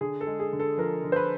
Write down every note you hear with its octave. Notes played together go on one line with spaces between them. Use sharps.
D3 G#4
A4
G#3
G#4
D3
A4
F3 A#4
D3
C5
B4